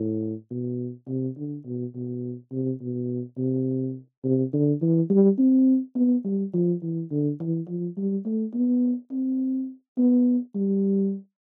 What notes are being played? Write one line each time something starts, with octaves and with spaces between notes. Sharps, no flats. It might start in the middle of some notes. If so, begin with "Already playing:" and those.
Already playing: A2
B2
C3
D3
B2
B2
C3
B2
C3
C3
D3
E3
G3
C4
B3
G3
F3
E3
D3
E3
F3
G3
A3
B3
C4
B3
G3